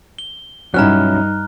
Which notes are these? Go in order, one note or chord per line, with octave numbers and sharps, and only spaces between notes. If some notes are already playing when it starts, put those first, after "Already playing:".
G7
G2 F#3 C#4 D#4 E4 A#5 F6 F#6